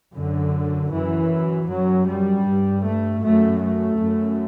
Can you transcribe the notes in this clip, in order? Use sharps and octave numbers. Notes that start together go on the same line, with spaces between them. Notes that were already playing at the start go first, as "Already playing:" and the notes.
F#2 D3
F#2 E3
F#2 F#3
G3
G2
A3
F#2 A3
A3
F#2